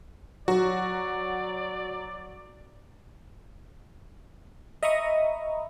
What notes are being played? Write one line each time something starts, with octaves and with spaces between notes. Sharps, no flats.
F#3 F#4 D5
D#5 E5 A#5 B5 C#6 D#6